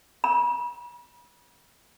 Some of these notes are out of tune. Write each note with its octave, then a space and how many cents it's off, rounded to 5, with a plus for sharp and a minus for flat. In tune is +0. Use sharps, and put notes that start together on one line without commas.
B5 -40